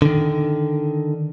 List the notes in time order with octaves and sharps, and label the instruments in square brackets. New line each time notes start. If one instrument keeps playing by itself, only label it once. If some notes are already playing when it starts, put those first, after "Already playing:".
[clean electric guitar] D3 D#3